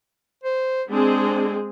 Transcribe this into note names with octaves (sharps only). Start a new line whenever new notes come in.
C5
G#3 C4 D4 G#4